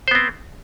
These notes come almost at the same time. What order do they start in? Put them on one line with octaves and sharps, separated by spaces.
C5 B3 C4